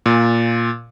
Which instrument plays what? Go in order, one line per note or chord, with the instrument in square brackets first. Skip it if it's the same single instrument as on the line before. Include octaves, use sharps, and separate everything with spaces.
[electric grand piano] A#2